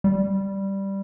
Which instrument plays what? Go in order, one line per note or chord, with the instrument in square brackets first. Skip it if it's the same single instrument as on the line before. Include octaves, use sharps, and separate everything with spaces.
[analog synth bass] G3